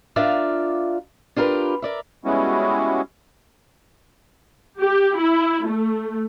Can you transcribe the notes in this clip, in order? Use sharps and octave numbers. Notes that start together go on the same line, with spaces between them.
D4 F4 A#4 D5 E5 F5
D4 F4 G4 A#4 B4
A#4 D5 E5
G3 G#3 B3 C#4 E4 F#4
G4
E4
A3